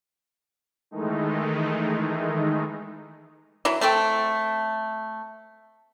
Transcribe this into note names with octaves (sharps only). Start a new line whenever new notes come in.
D#3 E3 G#3 A3 D#4
E3 F#3 E4
A3 C4 A4 G5